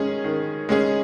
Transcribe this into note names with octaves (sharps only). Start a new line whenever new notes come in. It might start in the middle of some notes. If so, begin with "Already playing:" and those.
Already playing: D#3 G#3 C#4 G#4
D#3
G#3 C#4 G#4